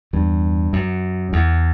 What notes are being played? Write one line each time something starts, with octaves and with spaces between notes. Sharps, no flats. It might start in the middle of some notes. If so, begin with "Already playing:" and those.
E2 G2
F#2
E2